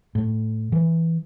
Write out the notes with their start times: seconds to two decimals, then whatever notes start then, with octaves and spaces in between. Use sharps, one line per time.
0.15 A2
0.72 E3